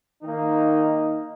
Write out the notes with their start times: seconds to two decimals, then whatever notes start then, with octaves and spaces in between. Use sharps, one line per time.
0.23 D#3 A#3 D#4